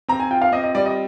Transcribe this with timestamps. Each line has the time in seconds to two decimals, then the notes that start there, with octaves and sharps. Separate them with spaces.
0.08 C4 A#5
0.20 G#5
0.31 F4 G5
0.42 F5
0.52 C4 D#5
0.64 D#5
0.75 G3 D5
0.85 D#5